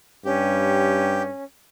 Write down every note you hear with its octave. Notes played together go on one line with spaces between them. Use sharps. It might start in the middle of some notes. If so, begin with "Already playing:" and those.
G2 C#4 G4